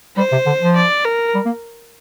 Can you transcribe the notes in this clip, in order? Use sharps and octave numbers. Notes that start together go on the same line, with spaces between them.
G3 C5
C3
D3
F3
D5
A#4
G3
A#3